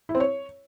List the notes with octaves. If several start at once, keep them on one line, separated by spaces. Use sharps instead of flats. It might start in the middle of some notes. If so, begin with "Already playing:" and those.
E4
C4
C#5